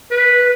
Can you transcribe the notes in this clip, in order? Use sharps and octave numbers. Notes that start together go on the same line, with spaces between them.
B4